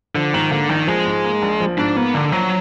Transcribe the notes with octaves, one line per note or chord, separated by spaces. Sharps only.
D3 F3
G#2 D#3
D3 A#3
A#1 D#3
F3 G#3
G#2
A#3
A#1
F3
G#2 D4
A#3 B3
A#1 D3
F3 F#3